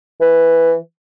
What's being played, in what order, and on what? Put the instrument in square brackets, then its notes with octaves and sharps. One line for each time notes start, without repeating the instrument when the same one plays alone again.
[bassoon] E3